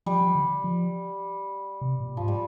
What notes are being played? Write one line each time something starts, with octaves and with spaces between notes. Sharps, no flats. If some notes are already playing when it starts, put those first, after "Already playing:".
F3 G3
F3
D3
F3
C3
A#2
G#2 F3
G3